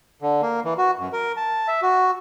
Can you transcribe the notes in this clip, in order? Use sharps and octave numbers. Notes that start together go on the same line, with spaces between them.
D3
A#3
E3
F#4
F#2
A#4
A5
E5
F#4